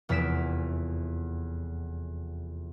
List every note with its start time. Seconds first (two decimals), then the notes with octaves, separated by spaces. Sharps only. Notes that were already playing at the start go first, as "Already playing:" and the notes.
0.09 F1 E2 E6 B6 D7 E7